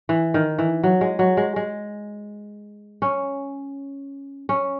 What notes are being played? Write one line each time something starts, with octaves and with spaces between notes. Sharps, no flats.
E3
D#3
E3
F#3
G#3
F#3
G#3
G#3
C#4
C#4